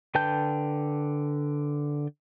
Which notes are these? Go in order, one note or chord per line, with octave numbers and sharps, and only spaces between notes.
D3 B4 G5 A5 G6